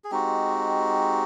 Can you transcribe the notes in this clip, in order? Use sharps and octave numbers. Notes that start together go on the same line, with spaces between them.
G#4
G#3 C4 D#4 F#4 G4